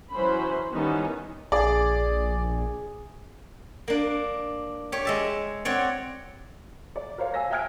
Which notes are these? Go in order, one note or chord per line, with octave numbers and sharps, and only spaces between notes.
E3 F#3 C#4 C5 B5
D#3 E3 G3 B3 C#4 D#4
A#1 G#4 D5
A#3 D4
G4 C#5
G#3 E5 A5
C4 F#4 C#5 D5
D5
A#4 C5 C#5 F5
F5 G#5 E6 A#6
E5 G5 G#5 F6 G#6 D7